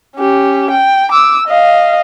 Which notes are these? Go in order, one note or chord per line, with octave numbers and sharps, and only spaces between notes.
C#4 G4
G5
D6 E6
D#5 F5